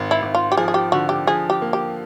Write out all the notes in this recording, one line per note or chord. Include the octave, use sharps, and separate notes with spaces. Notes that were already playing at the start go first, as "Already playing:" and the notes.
Already playing: G#1
E4
G#1
F4
G4
F3 G#4
G#4
G4
D3 F#4
G4
F3 G#4
G4
A#3
G4